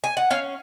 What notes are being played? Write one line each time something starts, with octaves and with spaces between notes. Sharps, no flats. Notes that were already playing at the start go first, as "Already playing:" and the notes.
G#5
F#5
C#4 F5